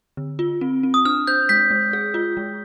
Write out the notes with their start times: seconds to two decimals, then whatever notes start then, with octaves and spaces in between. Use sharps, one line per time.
0.17 D3
0.39 F4
0.61 C4
0.83 C4
0.94 D#6
1.05 D4 F6
1.27 C5 G6
1.49 G#3 G6 B6
1.71 G#3
1.93 G#4
2.14 F4
2.37 G#3